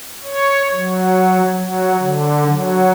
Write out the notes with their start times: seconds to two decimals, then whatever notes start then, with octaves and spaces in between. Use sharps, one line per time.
0.24 C#5
0.74 F#3
1.51 F#3
1.99 D3
2.45 F#3